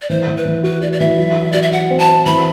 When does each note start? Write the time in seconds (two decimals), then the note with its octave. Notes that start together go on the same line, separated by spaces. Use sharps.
0.02 D5
0.10 E3 C5
0.27 E3
0.37 B4
0.45 E3
0.63 F#4 B4
0.81 F#4 D5
0.92 D5
1.00 E3 E5
1.17 F#3
1.36 F#4
1.52 F#4 D5
1.62 E5
1.72 F#4 F#5
1.90 C4
1.99 A5
2.08 C4
2.26 E3 B5